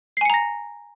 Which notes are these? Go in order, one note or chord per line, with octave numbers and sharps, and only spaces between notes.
G#5 A#5 A#6 C7 C#7